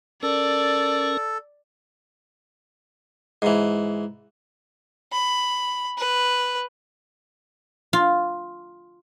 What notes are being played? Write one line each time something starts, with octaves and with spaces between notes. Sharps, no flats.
C#4 A4 A#4 D5
G#2 E3
B5
B4
F4